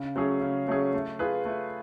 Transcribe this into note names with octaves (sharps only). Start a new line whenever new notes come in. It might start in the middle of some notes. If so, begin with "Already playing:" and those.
Already playing: C#3
F#3 A3 C#4 G#4
C#3
F#3 A3 C#4 G#4
A3
F4 G#4 B4
A3